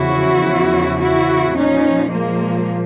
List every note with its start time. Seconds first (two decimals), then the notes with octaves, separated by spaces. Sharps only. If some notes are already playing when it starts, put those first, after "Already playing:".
Already playing: E2 C#3 F3 E4 F#4
1.00 E4 F#4
1.55 A#2 F3 C#4 D#4
2.10 G#3 A#3